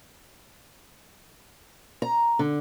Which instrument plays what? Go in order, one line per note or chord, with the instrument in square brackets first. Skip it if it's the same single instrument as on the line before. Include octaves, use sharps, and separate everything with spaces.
[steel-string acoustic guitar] A#5
D3